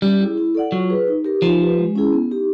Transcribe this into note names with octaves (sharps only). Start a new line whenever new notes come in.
G3 C#4
E4 G#4
E4
A4 D5 F#5
F#3 F4
G#4 B4
D#4
G4 A#4
F3 D#4
G4 B4
G#3
C#4 E4 G#4
B3
D#4 G4